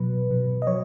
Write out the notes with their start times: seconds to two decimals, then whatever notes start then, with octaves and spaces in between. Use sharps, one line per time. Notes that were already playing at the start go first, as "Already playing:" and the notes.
Already playing: B2 F#3 B4
0.30 B2 F#3
0.62 D#5
0.67 F#3 C#5